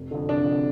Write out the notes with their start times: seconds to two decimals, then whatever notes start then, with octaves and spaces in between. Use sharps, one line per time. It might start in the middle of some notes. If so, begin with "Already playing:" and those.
Already playing: F1
0.11 F2 D3
0.29 F1 D4
0.46 F2
0.51 D3